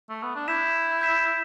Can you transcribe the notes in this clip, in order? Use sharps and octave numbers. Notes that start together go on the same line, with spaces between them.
A3
B3
D4
E4 G6 B6 E7
G6 B6 E7